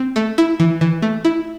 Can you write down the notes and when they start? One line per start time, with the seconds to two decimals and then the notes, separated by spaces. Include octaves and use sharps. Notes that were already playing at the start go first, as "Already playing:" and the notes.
Already playing: C4
0.16 A3
0.38 E4
0.60 E3
0.81 E3
1.02 A3
1.25 E4